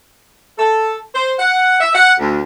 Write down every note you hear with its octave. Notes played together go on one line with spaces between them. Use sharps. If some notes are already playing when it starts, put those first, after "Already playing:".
A4
C5
F#5
E5
F#5
D2